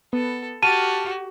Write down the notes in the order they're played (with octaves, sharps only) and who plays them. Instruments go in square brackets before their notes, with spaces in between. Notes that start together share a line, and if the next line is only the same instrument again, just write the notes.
[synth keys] B3 [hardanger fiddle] A4
[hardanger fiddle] F#4 G4 [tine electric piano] A5 [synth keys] F6 A6 [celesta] D#7